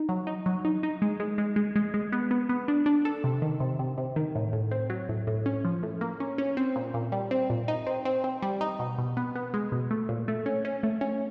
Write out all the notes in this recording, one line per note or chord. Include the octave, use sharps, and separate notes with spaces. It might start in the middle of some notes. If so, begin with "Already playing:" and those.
Already playing: D#4
F#3
D#4
F#3
D#4
D#4
G#3
G#3
G#3
G#3
G#3
G#3
B3
B3
B3
D4
D4
A4
C3
D#3
C3
C3
C3
D#3
A2
A2
C4
F#3
A2
A2
C#4
F3
A2
A#3
C#4
C#4
C4
A#2
A#2
G3
C4
A#2
D#4
C4
C4
C4
G3
D#4
B2
B2
B3
B3
G#3
B2
A3
A#2
A3
C#4
C#4
A3
C#4